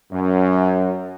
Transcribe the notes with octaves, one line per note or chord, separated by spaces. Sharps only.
F#2